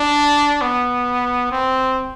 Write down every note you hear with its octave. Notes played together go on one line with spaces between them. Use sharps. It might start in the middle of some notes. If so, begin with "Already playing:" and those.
Already playing: D4
B3
C4